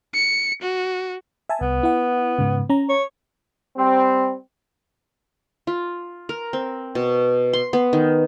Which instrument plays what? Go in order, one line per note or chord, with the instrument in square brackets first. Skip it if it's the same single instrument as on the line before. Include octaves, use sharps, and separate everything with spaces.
[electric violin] C#7
F#4
[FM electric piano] E5 G#5 A5
[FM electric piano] C2 [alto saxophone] B3
[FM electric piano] E4 F#5
G#2 C#3
C#4 A#5
[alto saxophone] C#5
[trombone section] G3 C4
[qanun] F4
A#4
C4
B2
C6
B3
D#3